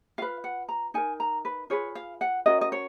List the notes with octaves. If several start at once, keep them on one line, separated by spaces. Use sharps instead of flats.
F4 B4 F5
F#5
A#5
D#4 A#4 G#5
A#5
B4
F4 G#4 B4 C#5
F5
F#5
C#4 F#4 A#4 D#5
D#5
C#5